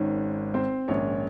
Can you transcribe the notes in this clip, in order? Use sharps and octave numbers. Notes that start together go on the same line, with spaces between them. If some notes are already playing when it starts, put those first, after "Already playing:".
Already playing: G#1 G#2 D#3 C#4
C4 C5
A#1 G#2 D#3 C#4 C#5